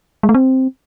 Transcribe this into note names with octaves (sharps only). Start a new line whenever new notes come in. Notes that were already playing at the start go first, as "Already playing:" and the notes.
G#3
A3
C4